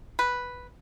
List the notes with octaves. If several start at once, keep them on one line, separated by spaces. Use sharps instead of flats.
B4